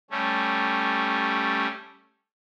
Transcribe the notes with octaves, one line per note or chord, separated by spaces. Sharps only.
G3 A3 C#4